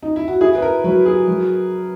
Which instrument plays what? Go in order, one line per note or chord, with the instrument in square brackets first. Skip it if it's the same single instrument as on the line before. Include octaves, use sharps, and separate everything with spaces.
[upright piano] D#4
E4
F#4
[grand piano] E4 [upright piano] G#4
[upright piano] B4
A#4
[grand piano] F#3 [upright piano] B4
[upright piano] G#4
[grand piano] F#3